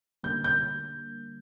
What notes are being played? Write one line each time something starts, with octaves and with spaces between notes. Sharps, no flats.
D3 G3 A#3 G6
G6